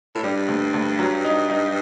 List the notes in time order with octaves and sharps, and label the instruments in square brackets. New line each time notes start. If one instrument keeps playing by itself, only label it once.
[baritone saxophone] A2
[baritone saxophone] G2 [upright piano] G3
[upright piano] D2
D2
F#3
D#4
D#4